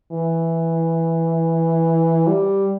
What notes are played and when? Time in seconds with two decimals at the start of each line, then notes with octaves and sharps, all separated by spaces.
0.12 E3
2.27 G3